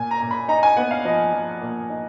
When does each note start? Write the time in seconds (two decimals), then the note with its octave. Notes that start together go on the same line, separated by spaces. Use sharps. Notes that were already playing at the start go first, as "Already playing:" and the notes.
Already playing: A#2 G#5
0.11 A#5
0.21 A#2
0.31 B5
0.48 D#4 A#5
0.63 G#5
0.77 B3 F#5
0.91 F5
1.05 F3 D#5
1.33 F3
1.61 A#2
1.90 D#4